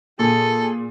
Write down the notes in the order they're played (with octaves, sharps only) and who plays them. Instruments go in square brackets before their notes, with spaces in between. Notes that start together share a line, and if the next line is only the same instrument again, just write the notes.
[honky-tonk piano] A#2 [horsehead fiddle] G#4 [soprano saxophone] A4